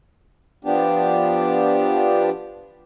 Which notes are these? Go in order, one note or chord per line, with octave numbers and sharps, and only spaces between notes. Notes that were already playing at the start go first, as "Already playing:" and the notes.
F3 B3 D4 G4